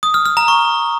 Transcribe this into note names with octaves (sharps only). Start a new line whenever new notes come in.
D#6
F6
F6
A#5
C#6